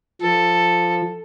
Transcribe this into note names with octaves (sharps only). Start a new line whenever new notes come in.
F3 A4